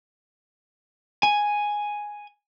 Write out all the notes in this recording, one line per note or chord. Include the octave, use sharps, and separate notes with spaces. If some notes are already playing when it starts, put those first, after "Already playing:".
G#5